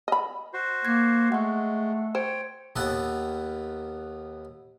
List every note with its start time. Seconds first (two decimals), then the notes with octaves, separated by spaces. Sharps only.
0.08 D#5 B5
0.53 F#4 C5
0.85 A#3 G#6 C7
1.32 G#3 A3 F#5 C#6
2.15 C5 C#5 G5
2.76 D#2 D#3 B3 A4 F#5